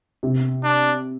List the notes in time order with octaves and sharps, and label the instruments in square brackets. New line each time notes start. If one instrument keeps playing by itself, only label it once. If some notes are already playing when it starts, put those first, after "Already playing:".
[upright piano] C3
[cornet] D4